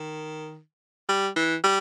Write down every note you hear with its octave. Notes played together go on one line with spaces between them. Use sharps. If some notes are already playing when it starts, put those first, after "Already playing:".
Already playing: D#3
G3
E3
G3